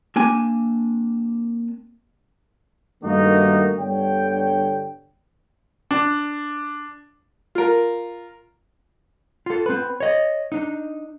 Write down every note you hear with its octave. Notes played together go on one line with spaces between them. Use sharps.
A#3 C4 D4 G#5
G2 D#3 A3 A#3 D#4 F#4
G1 D3 G3 C#5 G5
D4
F4 A#4
F4 A4
C4 B4
C#5 D#5
D4 D#4